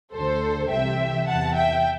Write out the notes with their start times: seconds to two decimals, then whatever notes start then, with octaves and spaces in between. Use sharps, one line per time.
0.14 D2 D3 A4 C5
0.70 C2 C3 E3 E5 G5
1.27 E2 C3 E3 F#5 A5
1.55 E5 G5